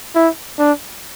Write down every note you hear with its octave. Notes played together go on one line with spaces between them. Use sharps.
E4
D4